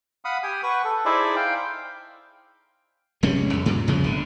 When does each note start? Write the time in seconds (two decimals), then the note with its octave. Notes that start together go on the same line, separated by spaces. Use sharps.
0.25 F5 F#5 B5 D#6
0.43 G4 G5 G#5 D#6
0.63 B4 F#5 C#6
0.85 A4
1.05 D#4 E4 G#4 C5 D5 E5
1.36 F5 G5
3.23 F1 G3 G#3 C#4
3.53 E2
3.66 G2 A#2 C#3
3.88 E2 C#3 F3 G#3
4.04 G1 D3